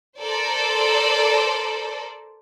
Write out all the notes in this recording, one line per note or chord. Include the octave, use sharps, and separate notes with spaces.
A4 A#4 C5 D5